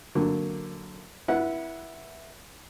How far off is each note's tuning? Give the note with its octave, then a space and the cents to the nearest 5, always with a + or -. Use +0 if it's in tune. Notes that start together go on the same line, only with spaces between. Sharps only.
D3 +0 F#3 +0 A#3 -5
E4 +0 B4 -30 F#5 +0